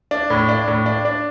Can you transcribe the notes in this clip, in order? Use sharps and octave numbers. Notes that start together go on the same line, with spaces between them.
D4
A2
D4
A2
D4
D4